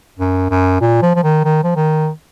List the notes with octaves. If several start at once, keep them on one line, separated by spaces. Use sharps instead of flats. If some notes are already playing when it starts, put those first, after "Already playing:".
F#2
F#2
A#2
F3
F3
D#3
D#3
F3
D#3